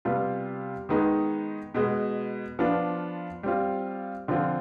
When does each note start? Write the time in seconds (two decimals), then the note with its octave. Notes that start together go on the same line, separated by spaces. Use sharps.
0.05 C3 G3 B3 F4
0.89 D#3 G#3 B3 D#4
1.74 B2 G#3 B3
2.59 F3 B3 D4 F4
3.43 G3 C4 F4
4.28 D3 F3 C4 F4